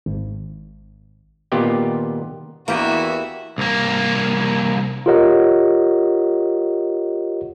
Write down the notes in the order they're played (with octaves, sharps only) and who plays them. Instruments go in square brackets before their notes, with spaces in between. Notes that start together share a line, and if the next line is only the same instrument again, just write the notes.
[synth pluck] G#1
[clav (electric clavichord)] A#2 D#3 B3 F4 G4 G5
[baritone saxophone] E2 [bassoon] E3 [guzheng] A#3 G4 D#5 [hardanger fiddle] F#4 E5
[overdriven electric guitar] C2 A#3
[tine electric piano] F4 G4 A#4 C#5 D#5 F#5